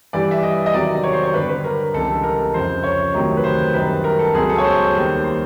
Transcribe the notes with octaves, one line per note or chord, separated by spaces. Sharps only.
G2 E3 G3 D5
E5
D#5
D#5
E2 C3 D#3 F#3 D5
C#5
C5
C#5
G2 D3 G3 B4
B4
A#4
C#2 C3 E3 G3 A4
A#4
F2 C#3 F3 C5
C#5
D2 C3 D#3 F#3
B4
C5
F#2 D#3 G3 B4
A#4
A4
C#2 B2 F#3 G#4
A4
C#5
C5
D#2 D#3 G3
C5